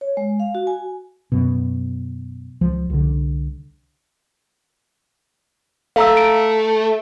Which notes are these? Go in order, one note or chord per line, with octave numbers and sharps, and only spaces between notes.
C#5
G#3
F5
F#4
G#5
F#2 B2
C#2 F3
C2 D3
A3 F5 A#5 E6
D7